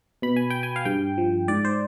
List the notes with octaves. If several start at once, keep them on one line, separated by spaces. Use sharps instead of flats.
B2 B5
G#5
G5
G#5
F5
G2 G5
F3
G#2 D5
C5